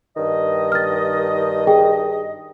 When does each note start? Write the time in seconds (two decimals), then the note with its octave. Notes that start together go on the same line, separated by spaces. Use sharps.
0.17 G2 D#3 D#5
0.72 F6 A6
1.67 G#4 G5